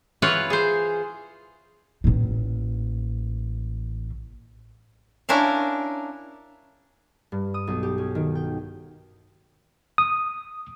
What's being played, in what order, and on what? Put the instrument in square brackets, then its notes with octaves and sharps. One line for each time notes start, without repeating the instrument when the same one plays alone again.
[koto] E3 F4 B4 C#5 F5 F#5
G#4 C5
[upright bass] A1 A#2
[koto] C#4 D4 E4 A#4 F5
[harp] G2
D#6
B1
G4
C#4
D#3
G5
[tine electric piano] D#6